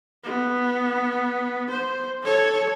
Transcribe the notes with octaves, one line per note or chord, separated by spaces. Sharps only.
B3
C5
A4 C#5